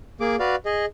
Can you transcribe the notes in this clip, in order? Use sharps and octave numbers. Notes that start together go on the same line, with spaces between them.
A#3 G#4 D6
F#4 B4 D5 F5
G#4 D#5